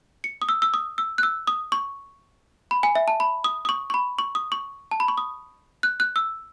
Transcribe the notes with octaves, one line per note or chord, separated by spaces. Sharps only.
C#7
D#6
E6
E6
D#6
E6
F#6
E6
D#6
C#6
B5
G#5
E5
A5
B5
D#6
D#6
C#6
C#6
B5
C#6
D#6
C#6
A5
B5
C#6
D#6
F#6
F#6
E6